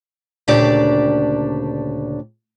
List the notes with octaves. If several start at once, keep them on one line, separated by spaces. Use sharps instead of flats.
D2 A#2 C#3 D4 G4 D5